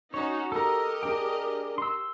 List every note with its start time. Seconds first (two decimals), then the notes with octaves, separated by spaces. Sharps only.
0.14 C#4 D#4 F#4 C#5
0.52 G4 A4 A#4 D#5 A#5
1.03 D4 G#4 G5
1.78 C6 E6